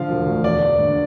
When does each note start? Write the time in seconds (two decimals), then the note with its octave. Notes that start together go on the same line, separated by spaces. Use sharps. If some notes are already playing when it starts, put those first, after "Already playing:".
Already playing: D3 F3 F5
0.09 E1
0.26 D2
0.44 E2 D5
0.62 E2
0.79 D3